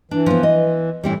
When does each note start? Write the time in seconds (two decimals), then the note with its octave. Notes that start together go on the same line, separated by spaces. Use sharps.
0.11 E3 D4
0.26 F3 B3
0.43 D#5
1.04 A2 E3 G3 C4 E4